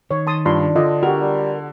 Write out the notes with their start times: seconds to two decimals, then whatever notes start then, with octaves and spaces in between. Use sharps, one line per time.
0.11 D#3 C#5
0.27 A5 C6 D#6
0.46 G2 D4 F4 C6
0.76 D3 F4 D#5 D6
1.03 F#4 G4 A#4
1.21 G3